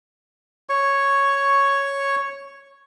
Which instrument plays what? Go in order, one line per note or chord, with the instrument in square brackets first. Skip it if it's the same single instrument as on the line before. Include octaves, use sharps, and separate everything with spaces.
[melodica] C#5 C#6